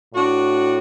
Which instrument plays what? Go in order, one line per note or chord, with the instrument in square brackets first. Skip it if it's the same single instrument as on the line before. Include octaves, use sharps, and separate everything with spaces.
[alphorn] A2 [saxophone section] D4 F#4